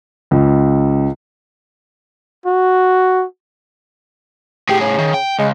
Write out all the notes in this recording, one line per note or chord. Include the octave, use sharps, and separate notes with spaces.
C#2
F#4
A2 G4 G#4
C#3
D#3
G5
C#2 G#3